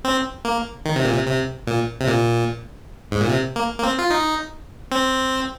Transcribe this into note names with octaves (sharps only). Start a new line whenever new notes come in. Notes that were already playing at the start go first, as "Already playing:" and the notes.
C4
A#3
D#3
C3
A#2
C3
C3
A#2
C3
A#2
G#2
A#2
C3
A#3
A#3
C4
F4
D#4
C4